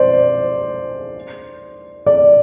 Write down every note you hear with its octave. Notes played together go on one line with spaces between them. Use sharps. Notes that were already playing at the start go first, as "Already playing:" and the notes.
Already playing: C5 D5
D5